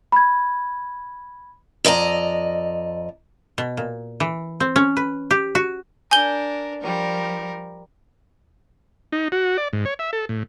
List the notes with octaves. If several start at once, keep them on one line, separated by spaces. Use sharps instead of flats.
B5 G#6
F2 D5 D#5 A#5
B2
A#2
E3
C4
C#4
B4
G4
F#4
D4 A#4 G#5 G6 G7
F3 G3 A#4
D#4
F#4
D5
G#2
C#5
E5
A4
A2